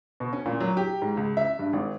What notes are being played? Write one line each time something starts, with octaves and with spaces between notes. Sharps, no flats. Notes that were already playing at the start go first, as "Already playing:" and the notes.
B2
C#4
A#2
F#3
G4
G#2
C#2
E5
G2
G#1